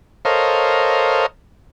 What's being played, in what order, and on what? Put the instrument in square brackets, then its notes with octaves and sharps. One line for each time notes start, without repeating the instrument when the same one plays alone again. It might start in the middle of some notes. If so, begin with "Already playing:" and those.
[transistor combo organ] A4 A#4 C5 C#5 D#5 F5